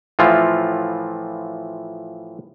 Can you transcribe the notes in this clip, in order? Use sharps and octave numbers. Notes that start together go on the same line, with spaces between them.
A2 E3 F3 F4